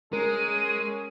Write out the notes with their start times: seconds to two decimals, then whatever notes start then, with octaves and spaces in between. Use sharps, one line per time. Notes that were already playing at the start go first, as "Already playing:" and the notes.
0.13 G#3 C#4 G#4 A#4 D#7